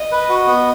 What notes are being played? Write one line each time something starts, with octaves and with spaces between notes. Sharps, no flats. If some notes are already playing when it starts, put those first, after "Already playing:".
Already playing: D#5
B4
F#4
B3